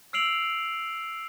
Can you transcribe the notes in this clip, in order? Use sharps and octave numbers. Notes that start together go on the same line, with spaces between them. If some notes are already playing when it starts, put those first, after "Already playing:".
E6 F6 C7 D7 F7 F#7